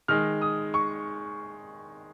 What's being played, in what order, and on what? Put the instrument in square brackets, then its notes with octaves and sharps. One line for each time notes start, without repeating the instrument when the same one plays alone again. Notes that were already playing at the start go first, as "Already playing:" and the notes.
[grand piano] D#3 G#3 F6
D#6
C#6